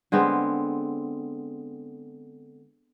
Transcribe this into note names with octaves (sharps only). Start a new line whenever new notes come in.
D3 G#3 B3 C4